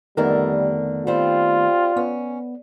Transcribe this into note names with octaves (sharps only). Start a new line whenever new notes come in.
F2 D3 D#3 G3 A3 B3 A#4
G3 C4 F4
B3 C#4